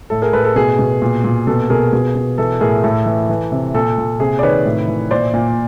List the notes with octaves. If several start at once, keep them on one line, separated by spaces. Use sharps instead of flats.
A2 A4
G#4 A#4
A2 A4 B4
A4
B2 G#4
B2
A#2
A#2
B2 A4
B2 G#4 A#4
B2 G#4
B2
E3 A4
A2 G#4 A#4
A2 A4
E3
E3
C3
A#2 A4
A#2
C3 G#4
D5
D#3 B4 C#5
A2
E3
A#2 C5 D5
A#2